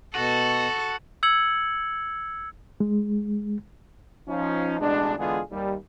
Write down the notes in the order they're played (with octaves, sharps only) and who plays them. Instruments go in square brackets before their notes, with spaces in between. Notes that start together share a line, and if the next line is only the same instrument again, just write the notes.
[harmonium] B2 F#5 [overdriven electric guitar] F#4 [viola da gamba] A4
[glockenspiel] E6 G#6 C#7 F#7
[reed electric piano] G#3
[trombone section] F3 C#4 D#4
A1 B2 G#3 D4
D3 E3 G#3 B3 F4 G#4
D#2 G3